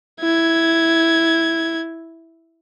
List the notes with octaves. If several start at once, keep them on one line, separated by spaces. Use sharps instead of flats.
E4 G#6